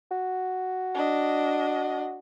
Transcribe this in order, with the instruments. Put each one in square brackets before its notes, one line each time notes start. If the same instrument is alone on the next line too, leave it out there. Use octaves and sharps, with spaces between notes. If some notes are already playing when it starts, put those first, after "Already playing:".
[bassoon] F#4
[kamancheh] D4 D#5